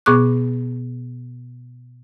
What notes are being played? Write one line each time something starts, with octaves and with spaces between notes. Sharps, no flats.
B2 B3 G#4 C#6 D6 F#6